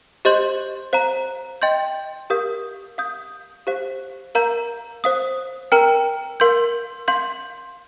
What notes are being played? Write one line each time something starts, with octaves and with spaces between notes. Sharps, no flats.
G4 C5 D#5 C6 G6
C5 F5 A#5
D#5 G5 C6 G6
G4 A#4 F5 D#6 G6
F5 D#6 G6
G4 C5 F5
A#4 F5 A#5 G6
C5 F5 D#6
A#4 G5 A#5 F6
A#4 F5 C6 G6
F5 C6 G6